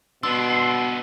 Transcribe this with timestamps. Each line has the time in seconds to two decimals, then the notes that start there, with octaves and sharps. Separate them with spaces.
0.23 B2 B3 D4 C6 E6